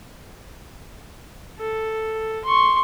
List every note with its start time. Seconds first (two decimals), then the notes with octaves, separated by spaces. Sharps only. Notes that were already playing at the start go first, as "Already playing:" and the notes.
1.59 A4
2.44 C6 C#6